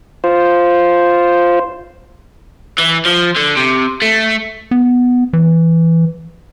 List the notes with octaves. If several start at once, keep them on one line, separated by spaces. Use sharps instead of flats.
F4 C5
E3
F3
D3
C3
A3
B3
E3